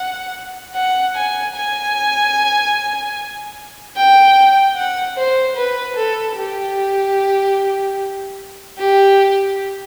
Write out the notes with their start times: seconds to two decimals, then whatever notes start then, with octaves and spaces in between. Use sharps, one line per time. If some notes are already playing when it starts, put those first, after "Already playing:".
Already playing: F#5
0.75 F#5
1.15 G#5
1.56 G#5
3.97 G5
4.76 F#5
5.17 C5
5.57 B4
5.97 A4
6.37 G4
8.78 G4